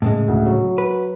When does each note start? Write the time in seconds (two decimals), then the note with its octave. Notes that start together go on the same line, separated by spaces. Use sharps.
0.02 A2 C#3 G#3
0.28 D2
0.46 F#3
0.78 B4